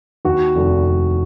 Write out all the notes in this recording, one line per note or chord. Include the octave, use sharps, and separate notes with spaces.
D#2 F#4
F1
F1